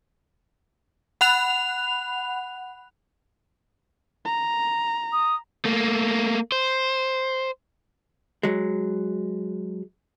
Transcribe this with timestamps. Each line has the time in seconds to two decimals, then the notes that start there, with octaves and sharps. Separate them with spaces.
1.21 F#5 B5 F#6 F7
4.25 A#5
5.13 D#6
5.65 A3 A#3
6.52 C5
8.43 F#3 G#3